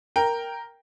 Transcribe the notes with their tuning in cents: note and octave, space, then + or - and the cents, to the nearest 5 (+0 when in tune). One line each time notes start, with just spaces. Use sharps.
A#4 +0 G5 +0